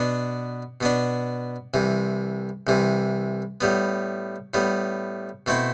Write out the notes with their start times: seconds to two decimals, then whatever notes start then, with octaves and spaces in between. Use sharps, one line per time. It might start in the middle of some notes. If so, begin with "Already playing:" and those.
Already playing: B2 B3 D4
0.81 B2 B3 D4
1.74 C2 C3 E3
2.67 C2 C3 E3
3.61 A2 G3 B3
4.54 A2 G3 B3
5.46 B2 A3 C4 E4